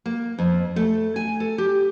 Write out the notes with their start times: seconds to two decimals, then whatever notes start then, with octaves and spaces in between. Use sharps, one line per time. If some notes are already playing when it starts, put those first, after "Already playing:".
0.06 A#3
0.38 F2
0.76 A3
1.16 G#5
1.40 A4
1.58 G4